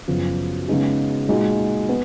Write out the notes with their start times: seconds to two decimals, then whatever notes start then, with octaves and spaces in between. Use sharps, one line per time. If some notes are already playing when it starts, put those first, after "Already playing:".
0.08 F#2 C#3 F3 B3
0.68 C#3 G#3 B3 D#4 G#4
1.29 A#2 G#3 D#4 F#4
1.89 B3